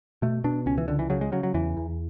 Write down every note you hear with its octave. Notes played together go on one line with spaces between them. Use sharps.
B2 A3
B2 D4
C#2 C#4
E3
C#2 D3
E3
C#3 F#3
G#3
C#3 F#3
F#3
E2 E3
E2